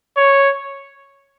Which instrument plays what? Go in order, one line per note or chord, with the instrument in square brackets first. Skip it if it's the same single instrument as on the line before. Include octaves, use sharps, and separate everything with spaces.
[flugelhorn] C#5